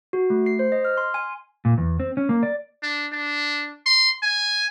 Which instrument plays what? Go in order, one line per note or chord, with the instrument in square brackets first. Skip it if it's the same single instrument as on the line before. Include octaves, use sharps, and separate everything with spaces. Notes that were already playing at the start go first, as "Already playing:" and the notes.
[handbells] F#4
A3
C7
C5
D#5
F6
C6
G#5
[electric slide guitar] A#2
E2
C4
C#4
A#3
D5
[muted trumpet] D4
D4
C6
G#5